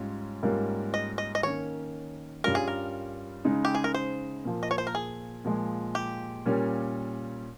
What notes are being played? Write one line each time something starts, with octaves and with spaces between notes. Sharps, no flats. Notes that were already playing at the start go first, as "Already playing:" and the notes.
Already playing: G#2 G3 C#4 F4 C#5
G#2 G3 A#3 C#4 F4
D#5
D#5
D#5
D#3 A#3 C#4 C#5
G2 G3 C#4 F4 A#4
G#4
A#4
C#3 G#3 D#4
G4
G#4
A#4
C5
A#2 F3 A#3
D#5
C#5
C5
A#4
G#4
A#2 F3 G#3
G4
A#2 G3 A#3 C#4